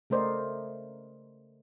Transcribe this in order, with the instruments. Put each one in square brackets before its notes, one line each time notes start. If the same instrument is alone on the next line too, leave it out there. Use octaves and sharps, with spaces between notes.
[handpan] C#3 A3 A#4 C5 D5 D#5